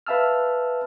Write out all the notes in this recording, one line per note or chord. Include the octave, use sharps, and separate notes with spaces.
B4 E5 F5 A5 E6 F6